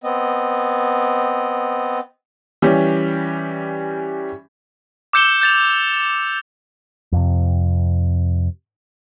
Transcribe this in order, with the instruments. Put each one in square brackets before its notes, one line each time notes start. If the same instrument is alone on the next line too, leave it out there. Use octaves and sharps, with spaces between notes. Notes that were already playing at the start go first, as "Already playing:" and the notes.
[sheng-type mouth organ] B3 C4 D#5
[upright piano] E3 G3 C#4 G4
[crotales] D6 E6 G6 C#7 E7 G7
G6 A6 F7
[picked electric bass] F2 C3